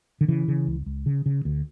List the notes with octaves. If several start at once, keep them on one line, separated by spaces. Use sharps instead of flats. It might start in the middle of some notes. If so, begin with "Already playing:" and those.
D3
C#3 E3
C#3
C#2
C#2
C#3
C#3
D2